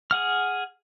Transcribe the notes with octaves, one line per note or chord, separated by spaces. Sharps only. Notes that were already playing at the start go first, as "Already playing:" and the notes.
G#4 F#5 F6